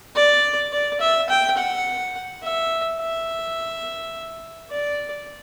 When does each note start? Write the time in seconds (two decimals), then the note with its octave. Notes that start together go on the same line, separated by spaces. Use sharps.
0.15 D5
0.72 D5
1.01 E5
1.30 G5
1.57 F#5
2.43 E5
3.00 E5
4.71 D5